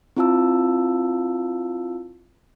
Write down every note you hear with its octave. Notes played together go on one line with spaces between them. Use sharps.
C4 E4 F4 F5 A5 E6